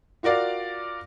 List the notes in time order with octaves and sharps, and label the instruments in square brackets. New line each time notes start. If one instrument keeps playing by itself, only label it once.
[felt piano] F4 F#4 A#4 D5 F5